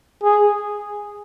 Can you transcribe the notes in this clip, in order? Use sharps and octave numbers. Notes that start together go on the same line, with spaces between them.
G#4